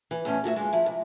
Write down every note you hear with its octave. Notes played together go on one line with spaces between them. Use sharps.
E3
E2 A2 C#4 D5
A#2 F#4 G4 E5
D3 G#3
F3 E4
C3